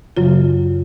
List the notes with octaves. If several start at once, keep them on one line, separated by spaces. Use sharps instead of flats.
F#2 C#3 F#3 F4